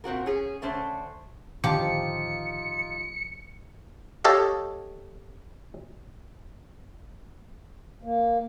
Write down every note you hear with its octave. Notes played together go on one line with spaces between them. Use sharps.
A#2 C4 F#4 A#4
C#4 G#4
D3 A3 C#4 C5 A5
A2 D3 D#3 F3 D#4 F4 G4 C#7
G4 A4 C#5 D#5 F5
A#3